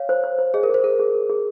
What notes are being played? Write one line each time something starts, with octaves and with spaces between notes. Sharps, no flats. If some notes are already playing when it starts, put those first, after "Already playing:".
Already playing: C#5 F5
C5
C5
C5
G#4 D#5
A#4
G#4 C5
G#4 A#4
G#4
G#4
G#4